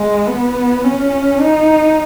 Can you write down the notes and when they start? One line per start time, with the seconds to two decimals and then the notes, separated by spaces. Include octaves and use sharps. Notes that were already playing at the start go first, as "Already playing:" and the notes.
Already playing: G#3
0.27 B3
0.84 C#4
1.40 D#4